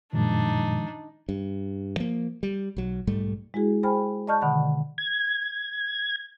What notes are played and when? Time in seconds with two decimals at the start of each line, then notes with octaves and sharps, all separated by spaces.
0.12 F#2 A#2 D#3 F3 G#3 D4 D#4
1.29 G2
1.96 F3 A#3
2.43 G3
2.77 B1 F#3
3.07 B1 G#2 G3 A3
3.54 G#3 E4 F#4 G#4
3.83 G#4 C5 G5 G#5 B5 F6
4.27 D5 D#5 A5 C#6 F6 G6
4.41 B2 D3 D#3 F#5 B5
4.98 G#6